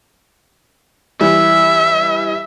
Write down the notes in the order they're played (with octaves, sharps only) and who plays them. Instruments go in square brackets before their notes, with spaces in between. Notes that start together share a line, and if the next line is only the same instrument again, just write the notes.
[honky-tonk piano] E3 G3 [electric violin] E5